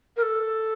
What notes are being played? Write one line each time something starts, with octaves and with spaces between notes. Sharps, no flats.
A#4
A4